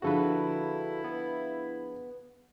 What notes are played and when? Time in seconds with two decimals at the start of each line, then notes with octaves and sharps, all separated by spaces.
0.02 D3 F3 E4 F#4 G#4 A4 B4
1.04 B3